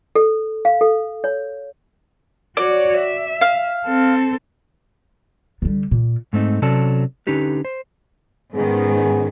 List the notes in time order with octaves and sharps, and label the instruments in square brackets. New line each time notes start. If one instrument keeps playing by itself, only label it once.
[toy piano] A4
F5
A4
C#5
[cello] F#4 C#5 [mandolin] D5
[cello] E5
[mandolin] F5
[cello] C4 A4
[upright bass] D3 G3
A#2
[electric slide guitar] G#2 A3 C4 D#4
C3 F#3 C#4 A4 D5 A5
D3 C#4 D#4 G4 B4
C5
[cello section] G#2 D#3 [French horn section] B3 C#4 G#4